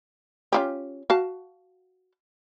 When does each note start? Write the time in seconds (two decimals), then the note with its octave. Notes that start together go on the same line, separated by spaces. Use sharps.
0.53 C#4 F4 G4
1.10 F#4 F5 A5